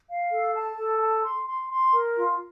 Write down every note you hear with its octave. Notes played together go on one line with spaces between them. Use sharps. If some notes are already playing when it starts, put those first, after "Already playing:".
F5
A4
A5
A4
A5
C6
C6
C6
A#4
F4